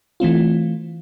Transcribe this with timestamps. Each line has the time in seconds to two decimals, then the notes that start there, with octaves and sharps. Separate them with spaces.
0.20 E3 A3 C4 F4